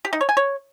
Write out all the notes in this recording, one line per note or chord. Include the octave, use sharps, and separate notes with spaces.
G4
D#4
C#5
G#5
C#5